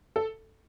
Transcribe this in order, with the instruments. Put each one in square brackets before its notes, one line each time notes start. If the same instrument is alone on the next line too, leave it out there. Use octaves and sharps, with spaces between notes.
[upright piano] A4